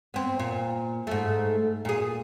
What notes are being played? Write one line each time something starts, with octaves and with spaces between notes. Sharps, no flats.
B3 C4
A#2
G#2 A3
A#2 G#4